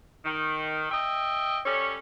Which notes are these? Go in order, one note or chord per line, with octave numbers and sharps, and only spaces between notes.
D#3
D#5 E5 G5
G3 C#4 A4 C#5